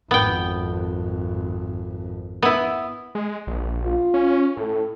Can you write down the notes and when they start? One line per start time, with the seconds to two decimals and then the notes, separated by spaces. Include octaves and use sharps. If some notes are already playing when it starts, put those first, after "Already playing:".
0.11 G#1 F2 B3 G5
2.42 B3 E4
3.15 G#3
3.47 A#1
3.83 F4
4.14 C#4
4.57 A2 A4